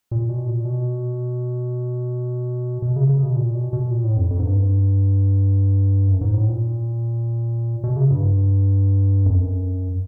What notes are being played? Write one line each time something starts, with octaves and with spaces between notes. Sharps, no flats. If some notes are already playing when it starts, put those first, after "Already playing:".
A#2
B2
A#2
B2
B2
C#3
C#3
B2
A#2
B2
B2
A#2
A2
F2
F2
G#2
G2
F#2
G#2
A2
A#2
B2
C#3
G2
F2
F#2